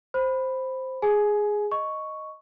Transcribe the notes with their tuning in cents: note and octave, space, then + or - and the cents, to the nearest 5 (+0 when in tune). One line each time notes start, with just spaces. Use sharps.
C5 +0 B5 +0
G#4 +0 G#5 +20
D#5 +0 C#6 +0